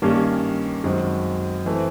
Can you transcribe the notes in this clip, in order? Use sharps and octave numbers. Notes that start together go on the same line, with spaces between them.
G2 D#3 G3 A#3 C#4
F#2 D#3 G#3 C4
E3 A3 C4